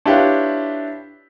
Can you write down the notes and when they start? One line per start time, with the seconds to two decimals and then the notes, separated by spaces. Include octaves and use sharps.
0.06 D4 E4 F4 G4 B4 C#5